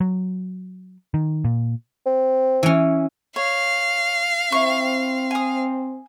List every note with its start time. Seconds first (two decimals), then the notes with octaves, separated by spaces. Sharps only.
0.01 F#3
1.14 D#3
1.45 A#2
2.06 C4
2.63 E3 C#4
3.36 C#5 F5
4.52 C4 E4 C#6
5.31 G#5 D#6